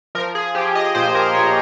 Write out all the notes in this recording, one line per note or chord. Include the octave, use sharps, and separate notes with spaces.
F3 A#4
G#4
F3 G4
D#5
A#2 C5
A#4
A#2 C#5